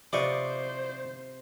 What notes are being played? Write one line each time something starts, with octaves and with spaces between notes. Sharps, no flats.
C3 F4 B4 C5 D5 D#5 C#6